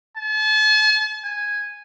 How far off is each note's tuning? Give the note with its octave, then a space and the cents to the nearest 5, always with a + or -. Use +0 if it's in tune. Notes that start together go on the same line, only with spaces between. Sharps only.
A5 -40
G#5 -5